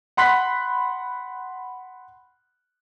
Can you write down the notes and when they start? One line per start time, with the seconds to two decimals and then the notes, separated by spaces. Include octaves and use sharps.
0.17 F#5 B5 C6 F#6 B6